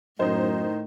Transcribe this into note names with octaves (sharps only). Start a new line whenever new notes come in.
F#2 A2 D#3 D#4 C5